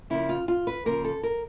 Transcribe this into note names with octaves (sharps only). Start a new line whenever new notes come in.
C#3 F3 A#3 E4
F4
F4
B4
C#3 F3 A#3 A#4
A4
A#4